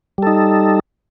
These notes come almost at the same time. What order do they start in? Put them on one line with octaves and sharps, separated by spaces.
G3 A4 D#4